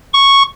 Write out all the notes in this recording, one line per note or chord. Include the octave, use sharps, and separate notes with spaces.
C#6